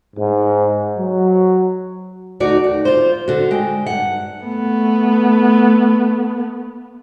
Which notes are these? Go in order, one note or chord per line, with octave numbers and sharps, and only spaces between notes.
G#2
F#3
D2 D#4 F#4 D5
D#2
F4 C5
D3 F#4
G#3 G5
G2 F#5
A3 B3